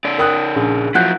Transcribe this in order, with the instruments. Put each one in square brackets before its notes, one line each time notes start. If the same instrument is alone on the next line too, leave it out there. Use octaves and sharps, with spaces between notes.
[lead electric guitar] C#3 D5
[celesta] A#4 [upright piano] G5 D#6 F#6
[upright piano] A#1 C#4 G#4
[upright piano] F3 [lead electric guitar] F#3 E4 [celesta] F#5 F#6 G6